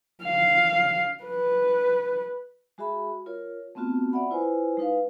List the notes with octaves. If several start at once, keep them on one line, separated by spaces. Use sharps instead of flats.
F5
B4
G#3 F#4 G#4 E5 B5
F4 A#4 C#5
A3 B3 C4 F4 F#4
D5 E5 F#5 B5
E4 F4 B4 C5 G#5
G#3 D#4 B4 F5